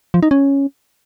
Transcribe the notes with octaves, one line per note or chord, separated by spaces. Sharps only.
F3
D#4
C#4